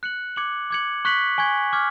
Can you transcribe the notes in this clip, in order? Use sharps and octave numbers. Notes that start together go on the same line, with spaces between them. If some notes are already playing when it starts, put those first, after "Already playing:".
F#6 C#7 F#7
D6 G#6 C#7 F#7
D6 G#6 C#7 F#7
C#6 F#6 B6 F#7
G#5 C#6 G#6
D6 F6 G#6